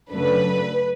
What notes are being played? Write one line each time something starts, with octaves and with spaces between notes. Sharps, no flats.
F#2 C#3 F#3 A3 D4 B4